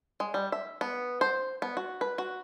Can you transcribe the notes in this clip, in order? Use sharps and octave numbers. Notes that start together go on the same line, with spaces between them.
G#3
G3
E5
B3
C5
B3
F#4
B4
F#4